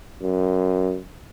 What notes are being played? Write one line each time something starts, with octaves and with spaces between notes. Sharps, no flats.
F#2